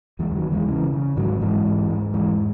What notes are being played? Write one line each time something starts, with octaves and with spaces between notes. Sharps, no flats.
E2 E3 G#3
E3
D#3 F#3
E2
E3 G#3
C#3 E3
C#3
G#2 D#3 F#3
G#2 E3 G#3
G#2
G#2
E2 E3 G#3